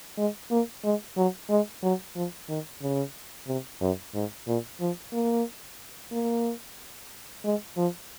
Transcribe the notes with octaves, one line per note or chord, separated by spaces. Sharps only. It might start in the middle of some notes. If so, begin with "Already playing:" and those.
G#3
A#3
G#3
F#3
G#3
F#3
F3
D#3
C#3
C3
F#2
G#2
A#2
F3
A#3
A#3
G#3
F3